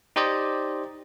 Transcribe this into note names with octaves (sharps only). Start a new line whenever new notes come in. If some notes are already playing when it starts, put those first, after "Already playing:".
D#4 G4 C5 D5 D#5